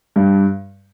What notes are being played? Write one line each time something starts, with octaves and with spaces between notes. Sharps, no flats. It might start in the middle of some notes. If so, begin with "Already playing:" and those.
G2